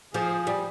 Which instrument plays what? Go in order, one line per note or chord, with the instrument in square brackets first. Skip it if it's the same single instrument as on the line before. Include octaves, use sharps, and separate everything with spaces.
[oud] F3 [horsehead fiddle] G#4
[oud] G3